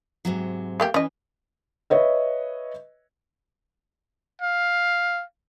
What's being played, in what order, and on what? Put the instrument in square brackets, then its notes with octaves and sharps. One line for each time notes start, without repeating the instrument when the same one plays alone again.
[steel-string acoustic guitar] G#2 C3 F#3
[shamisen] A3 A#3 G4
[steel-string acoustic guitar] E3 [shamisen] C#4 D#5
[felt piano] B4 C#5 D#5 E5
[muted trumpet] F5